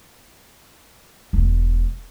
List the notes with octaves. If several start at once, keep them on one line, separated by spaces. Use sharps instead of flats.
E1